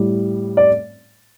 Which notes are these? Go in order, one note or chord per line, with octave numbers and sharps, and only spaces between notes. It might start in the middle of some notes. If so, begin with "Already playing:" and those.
Already playing: A2 G3
D5